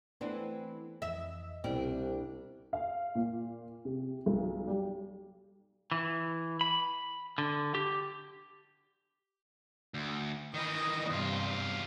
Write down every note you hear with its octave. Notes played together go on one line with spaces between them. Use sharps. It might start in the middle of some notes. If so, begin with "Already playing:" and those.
E3 A3 B3 C4 D4
F2 E3 D#5 E5
C2 B2 G3 C4 D4
F5
A#2
C3
B1
G3
E3
B5
D3
G4
D2
D#3 E3 D#5
E2 G2 C3 F4